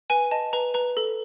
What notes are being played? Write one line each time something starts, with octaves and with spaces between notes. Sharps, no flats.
B4 G#5
D#5 A5
B4 A#5
B4 A#5
A4